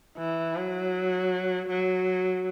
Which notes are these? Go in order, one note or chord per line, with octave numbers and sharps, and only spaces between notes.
E3
F#3
F#3